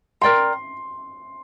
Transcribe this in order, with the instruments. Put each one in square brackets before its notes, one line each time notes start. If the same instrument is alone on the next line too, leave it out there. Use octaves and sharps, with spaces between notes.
[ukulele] A#4 D5 G5 A#5 [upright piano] C6